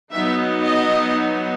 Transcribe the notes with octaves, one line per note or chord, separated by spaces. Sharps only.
F#3 B3 D#4 E5
D#5